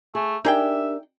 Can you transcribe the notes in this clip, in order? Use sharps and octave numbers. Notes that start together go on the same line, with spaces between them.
A3 G#4
D4 D#4 G4 G#4 A#4 E5 G5